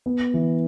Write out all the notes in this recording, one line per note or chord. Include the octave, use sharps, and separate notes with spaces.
B3
E3